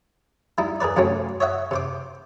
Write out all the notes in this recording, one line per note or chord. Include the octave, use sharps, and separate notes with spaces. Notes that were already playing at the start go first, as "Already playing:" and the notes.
G3 D#4 E4
G#4 A#4 B4 D5
F#2 C3 F#3 A3 C4 C#4
C#5 D#5 E5 F#5
C3 C5 D6